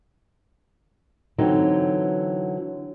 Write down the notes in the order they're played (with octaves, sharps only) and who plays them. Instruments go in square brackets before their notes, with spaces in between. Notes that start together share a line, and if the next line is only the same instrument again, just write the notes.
[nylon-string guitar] D3 E3 F#3 C4 D#4